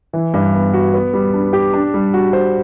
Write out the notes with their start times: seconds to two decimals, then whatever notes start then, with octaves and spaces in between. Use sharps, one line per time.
0.13 E3
0.34 G2
0.54 B3
0.74 F#4
0.94 B3
1.14 G3
1.34 D4
1.53 G4
1.74 D4
1.94 G3
2.14 F#4
2.33 C5